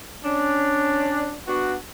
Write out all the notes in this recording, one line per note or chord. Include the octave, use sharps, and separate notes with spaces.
C#4 D4
B3 D4 F#4